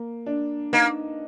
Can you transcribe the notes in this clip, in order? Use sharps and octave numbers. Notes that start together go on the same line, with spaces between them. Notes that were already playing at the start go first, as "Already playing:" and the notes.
Already playing: A#3
D4
A#3 D#4